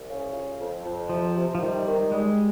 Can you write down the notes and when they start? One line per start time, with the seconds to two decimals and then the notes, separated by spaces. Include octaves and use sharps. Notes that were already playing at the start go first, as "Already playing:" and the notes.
Already playing: C2
0.08 C#3
0.34 F4
0.59 F2
0.84 F2
1.09 C3 F3
1.36 C3
1.55 F3
1.61 D#3 G3
1.86 D#3
2.11 G3 G#3